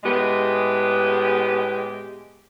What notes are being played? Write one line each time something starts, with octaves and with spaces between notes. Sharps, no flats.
A2 G#3 B3 G4 G#4